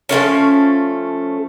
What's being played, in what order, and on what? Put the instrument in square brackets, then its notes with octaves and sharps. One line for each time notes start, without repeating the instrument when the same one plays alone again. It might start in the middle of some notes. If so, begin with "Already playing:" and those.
[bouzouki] F3 G#3 A3 C#4